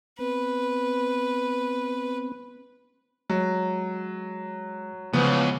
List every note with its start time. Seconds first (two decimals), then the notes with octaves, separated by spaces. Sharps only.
0.19 B3 C4 B4
3.30 F#3 G#3
5.13 C#2 E3 F3 B3